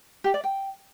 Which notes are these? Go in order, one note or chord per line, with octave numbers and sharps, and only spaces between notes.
G4
D5
G5